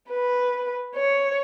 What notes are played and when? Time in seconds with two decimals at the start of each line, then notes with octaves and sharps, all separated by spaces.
0.10 B4
0.96 C#5